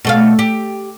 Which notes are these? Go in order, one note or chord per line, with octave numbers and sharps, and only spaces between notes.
B2 A3 F5
G4